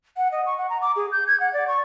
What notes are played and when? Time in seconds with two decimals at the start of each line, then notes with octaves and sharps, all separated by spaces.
0.17 F#5
0.32 D#5
0.46 C#6
0.58 F#5
0.70 A#5
0.82 D6
0.96 G#4
1.12 G6
1.27 G#6
1.40 F#5
1.53 D5
1.68 C#6